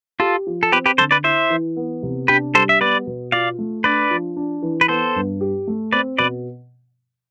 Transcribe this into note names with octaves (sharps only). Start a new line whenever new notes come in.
F4 G4 A4
F3
A4
C4 G4 B4
G4 B4
D3 A4 C5
B4 D5
E4 C5 E5
E3
B3
C3
D4 G4 B4
G3 A4 C5
E5
B3 B4 D5
B2
F4 D5 F5
A3
D4 B4 D5
F3
D4
E3
B4
B3 A4 C5
G2
G4
A3
C4 B4 D5
B2 B4 D5